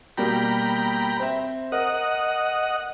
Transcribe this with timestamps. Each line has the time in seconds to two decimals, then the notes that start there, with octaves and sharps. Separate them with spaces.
0.17 B2 G3 A#3 G5 A#5 B5
1.20 C4 E5
1.72 A#4 D#5 F#5